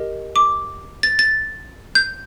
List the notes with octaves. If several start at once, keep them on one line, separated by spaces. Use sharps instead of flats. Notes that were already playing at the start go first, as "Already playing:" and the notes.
Already playing: G4 A#4 D#5
D6
A6
A6
G6